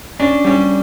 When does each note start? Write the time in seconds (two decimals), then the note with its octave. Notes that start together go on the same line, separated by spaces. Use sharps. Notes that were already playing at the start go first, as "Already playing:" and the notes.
0.20 C#4 D4
0.45 G3 C#4